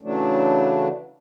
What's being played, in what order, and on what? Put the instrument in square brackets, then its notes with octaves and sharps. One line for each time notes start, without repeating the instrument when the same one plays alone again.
[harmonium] C#3 E3 F#3 A3 D4